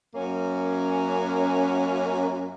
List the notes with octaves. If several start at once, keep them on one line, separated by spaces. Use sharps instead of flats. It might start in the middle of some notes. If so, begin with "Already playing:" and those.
F#2 A#3 C#4